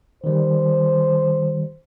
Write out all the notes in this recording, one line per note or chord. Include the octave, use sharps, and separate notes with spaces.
D#3 G3 C5